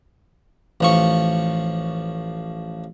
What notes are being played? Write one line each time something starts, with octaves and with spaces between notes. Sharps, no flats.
A1 F3 C#6